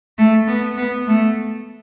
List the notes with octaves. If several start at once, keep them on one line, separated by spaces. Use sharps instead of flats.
A3
B3
B3
A3